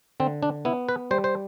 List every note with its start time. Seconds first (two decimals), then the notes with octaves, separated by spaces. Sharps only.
0.20 D3 C4
0.43 D4
0.65 B3 E4
0.89 B4
1.11 G3 C5
1.24 C5